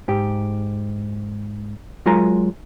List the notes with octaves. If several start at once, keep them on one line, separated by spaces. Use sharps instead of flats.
G#2 G4
F#3 G#3 F4 A#4 G#5 A#5